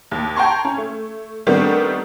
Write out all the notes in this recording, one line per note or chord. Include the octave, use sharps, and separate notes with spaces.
D#2
G5 A5 A#5 C6 C#6 G#6
C#4
A3
D#3 G3 A3 B3 C4 D4